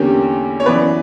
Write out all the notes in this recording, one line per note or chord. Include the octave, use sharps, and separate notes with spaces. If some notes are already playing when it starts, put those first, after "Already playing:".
Already playing: E2 D3 A#3 C#4 G4
C#5
F#2 E3 B3 B4 D5